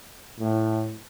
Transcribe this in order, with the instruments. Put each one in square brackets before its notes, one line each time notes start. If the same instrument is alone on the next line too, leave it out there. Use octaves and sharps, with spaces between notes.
[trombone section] A2